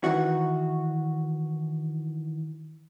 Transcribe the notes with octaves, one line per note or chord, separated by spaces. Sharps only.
D#3 E3 F#4